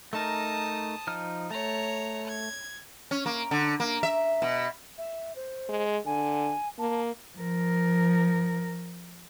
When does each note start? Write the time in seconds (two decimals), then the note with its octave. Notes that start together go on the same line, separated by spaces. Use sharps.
0.13 A3 D#4 A#4 A5 D#6
1.07 F3 D#4 F6
1.51 A3 C#5 A#5
2.28 G#6
3.11 C#4
3.26 A#3
3.51 D3
3.80 A#3
4.03 E5
4.42 B2
4.98 E5
5.36 C5
5.69 G#3
6.06 D3 G#5
6.79 A#3 A5
7.37 F3 A#4